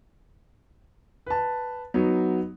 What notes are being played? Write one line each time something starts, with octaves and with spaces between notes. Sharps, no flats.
B4 A5
F#3 B3 D#4